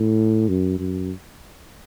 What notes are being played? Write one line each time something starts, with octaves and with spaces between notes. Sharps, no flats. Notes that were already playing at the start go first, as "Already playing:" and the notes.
Already playing: A2
F#2
F#2